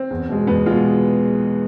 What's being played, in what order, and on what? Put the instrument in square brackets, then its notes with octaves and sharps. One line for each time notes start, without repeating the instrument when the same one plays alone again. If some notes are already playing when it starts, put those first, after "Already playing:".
Already playing: [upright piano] C4
[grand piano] E2
B2 G#3
[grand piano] E2 [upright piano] B3
[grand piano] B2 G#3 [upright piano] F4